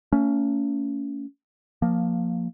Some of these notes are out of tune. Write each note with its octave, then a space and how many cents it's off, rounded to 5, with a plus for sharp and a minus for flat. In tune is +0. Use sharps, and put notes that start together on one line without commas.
A3 +45 C#4 +20
F3 +15 A#3 +0